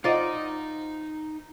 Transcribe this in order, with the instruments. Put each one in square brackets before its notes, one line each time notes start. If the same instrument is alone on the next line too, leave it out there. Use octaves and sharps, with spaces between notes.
[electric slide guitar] D#4 A#5 [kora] F4 D5 [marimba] C5 D#5 F#5